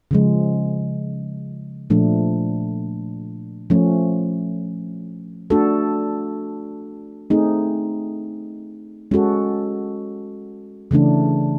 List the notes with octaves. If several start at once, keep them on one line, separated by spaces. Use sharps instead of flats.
C#3 F3 G#3
A#2 F3 A3 D4
F3 A3 C#4
A3 D4 F#4 A4
A3 C4 D#4 G#4
G#3 C#4 F#4 A4
C#3 E3 A3 D4